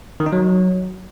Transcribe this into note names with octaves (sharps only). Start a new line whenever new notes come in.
D#3
D#4
F#3